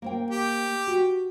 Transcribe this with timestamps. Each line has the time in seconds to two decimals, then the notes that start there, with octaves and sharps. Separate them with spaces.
0.02 A#3 C5 G5
0.30 G4
0.87 F#4